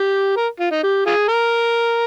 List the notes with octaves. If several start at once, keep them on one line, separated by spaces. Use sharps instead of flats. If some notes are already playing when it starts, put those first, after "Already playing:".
Already playing: G4
A#4
F4
D#4
G4
F4 G#4
A#4